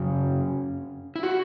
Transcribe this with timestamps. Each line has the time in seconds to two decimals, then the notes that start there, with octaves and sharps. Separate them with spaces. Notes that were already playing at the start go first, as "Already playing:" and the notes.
Already playing: F#2 C#3 F#3 C#4
1.16 E4
1.23 F#4